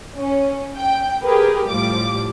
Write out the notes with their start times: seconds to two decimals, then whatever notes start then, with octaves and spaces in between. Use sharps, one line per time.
0.18 C#4
0.77 G5
1.22 G4 G#4 A#4 B4
1.68 A2 F3 G3 D6